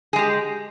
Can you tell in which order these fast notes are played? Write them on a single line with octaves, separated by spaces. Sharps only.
G#4 G#3 G4